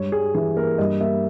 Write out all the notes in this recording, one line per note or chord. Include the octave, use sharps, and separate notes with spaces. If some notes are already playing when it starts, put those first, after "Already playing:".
Already playing: G2 G#3 C#5
G3 G#4
E3 G#4
A#3 A#4
G2 D#5
A#3 E5